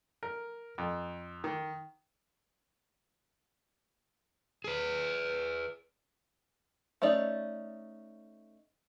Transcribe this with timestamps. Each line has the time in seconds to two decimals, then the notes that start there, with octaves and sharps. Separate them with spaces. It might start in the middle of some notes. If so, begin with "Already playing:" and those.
0.23 A#4
0.78 F2
1.44 D#3
4.64 G#4 B4
7.02 A3 C#4 D#4 D5